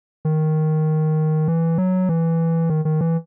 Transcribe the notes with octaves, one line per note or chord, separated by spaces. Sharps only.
D#3
E3
F#3
E3
D#3
D#3
E3